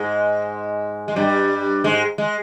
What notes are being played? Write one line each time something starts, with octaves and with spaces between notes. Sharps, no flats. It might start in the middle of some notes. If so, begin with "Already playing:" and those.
Already playing: G#2 G#3
G#3
G2 G3
G#2 G#3
G#3